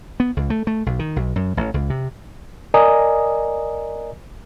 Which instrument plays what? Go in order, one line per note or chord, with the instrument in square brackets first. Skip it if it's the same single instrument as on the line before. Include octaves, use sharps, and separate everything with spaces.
[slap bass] B3
C#2
A3
A3
B1
D#3
B1
F#2
A1
C#2
C3
[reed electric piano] A#4 D5 D#5 G#5 A#5 D#6